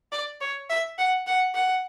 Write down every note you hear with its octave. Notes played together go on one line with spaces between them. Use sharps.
D5
C#5
E5
F#5
F#5
F#5